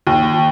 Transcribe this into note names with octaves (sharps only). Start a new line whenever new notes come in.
D#2